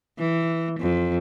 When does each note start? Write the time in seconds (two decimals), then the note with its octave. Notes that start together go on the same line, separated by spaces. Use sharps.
0.18 E3
0.80 F2